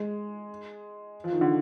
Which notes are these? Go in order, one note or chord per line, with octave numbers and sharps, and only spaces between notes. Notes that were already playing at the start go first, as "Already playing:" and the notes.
Already playing: G#3
F3
D#3
D3